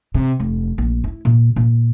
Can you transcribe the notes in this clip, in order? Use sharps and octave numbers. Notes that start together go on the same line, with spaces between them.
C3
F1
A#1
E4
A#2
A#2